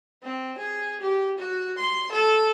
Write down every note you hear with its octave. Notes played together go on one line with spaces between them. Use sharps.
C4
G#4
G4
F#4
C6
A4